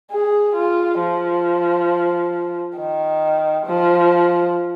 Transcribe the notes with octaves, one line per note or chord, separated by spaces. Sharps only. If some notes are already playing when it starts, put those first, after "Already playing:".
G#4
F4
F3
D#3
F3